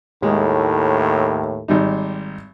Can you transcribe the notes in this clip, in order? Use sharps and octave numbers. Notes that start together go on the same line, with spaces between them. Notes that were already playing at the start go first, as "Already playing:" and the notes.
D#2 A2 G#3
G#1 G3 D#4